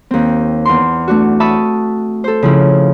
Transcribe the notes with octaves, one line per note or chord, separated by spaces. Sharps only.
D#2 C4
E2 C6
A3 D4 F#4
E5 A5 B5 C#6 D#6
A4 C5
C#3 F3 E4